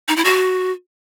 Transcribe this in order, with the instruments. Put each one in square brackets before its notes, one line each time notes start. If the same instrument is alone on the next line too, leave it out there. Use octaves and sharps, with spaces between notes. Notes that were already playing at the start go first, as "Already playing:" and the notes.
[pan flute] D#4
E4
F#4